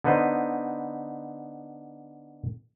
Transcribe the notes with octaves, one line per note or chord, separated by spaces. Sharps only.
D3 B3 D#4 B4 C5